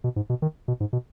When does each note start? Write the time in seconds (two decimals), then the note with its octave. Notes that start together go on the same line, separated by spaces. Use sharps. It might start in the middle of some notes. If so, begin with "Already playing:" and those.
0.04 B2
0.16 G#2
0.30 B2
0.42 D#3
0.68 B2
0.80 G#2
0.93 B2